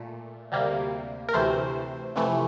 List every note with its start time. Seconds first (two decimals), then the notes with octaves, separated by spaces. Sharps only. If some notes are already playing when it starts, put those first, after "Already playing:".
Already playing: A#2 A3
0.52 D2 C3 G3 A#3
1.29 A#4
1.33 D2 C3 E3 A3 C5
2.16 F2 C3 E3 A3